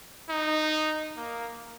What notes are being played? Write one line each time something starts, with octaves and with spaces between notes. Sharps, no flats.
D#4
A#3